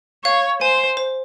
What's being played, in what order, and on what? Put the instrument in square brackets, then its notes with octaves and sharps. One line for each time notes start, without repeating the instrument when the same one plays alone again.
[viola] C#5 [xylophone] F5
[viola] C5 [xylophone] G#5
[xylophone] C5